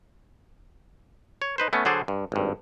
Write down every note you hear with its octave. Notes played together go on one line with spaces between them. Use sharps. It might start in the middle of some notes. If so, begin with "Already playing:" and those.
C#5
D#4 B4 C5
A3 B3 C#4
D3 F#3 G#4 A4 C5 D5
G2
G#1 G2